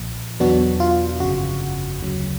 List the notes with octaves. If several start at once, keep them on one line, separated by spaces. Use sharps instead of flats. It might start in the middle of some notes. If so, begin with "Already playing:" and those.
Already playing: B1 A#2 F3
E2 B2 F#3 B3 D4 F#4
F4
G1 F2 C#3 F#4
D2 C#3 F#3